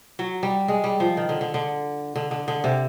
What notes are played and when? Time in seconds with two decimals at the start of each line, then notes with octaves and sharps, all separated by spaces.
0.19 F#3
0.43 G3
0.68 G#3
0.84 G3
1.00 F3
1.17 D#3
1.29 D3
1.41 D3
1.54 D3
2.16 D3
2.31 D3
2.48 D3
2.64 C3